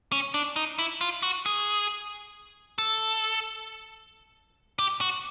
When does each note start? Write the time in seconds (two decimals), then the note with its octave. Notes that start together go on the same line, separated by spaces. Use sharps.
0.12 C#4
0.34 D4
0.56 D#4
0.79 E4
1.01 F4
1.23 F#4
1.46 G#4
2.78 A4
4.79 G4
5.01 F#4